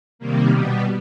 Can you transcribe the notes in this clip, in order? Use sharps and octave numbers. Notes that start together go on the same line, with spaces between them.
C3 D#3 G3 A#3
B2 G3 B3